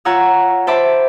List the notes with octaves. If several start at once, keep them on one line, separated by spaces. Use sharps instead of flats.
F4 C#5 F#5 A#5 E6
C5 E5 A5 B5 D6